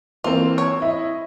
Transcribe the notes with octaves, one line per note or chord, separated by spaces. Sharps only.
E3 A#3 C4 F4
C#5
E4 D#5